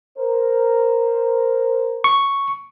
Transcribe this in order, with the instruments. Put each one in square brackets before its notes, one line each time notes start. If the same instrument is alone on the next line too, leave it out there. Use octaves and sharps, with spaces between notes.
[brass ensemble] A#4 C5
[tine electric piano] C#6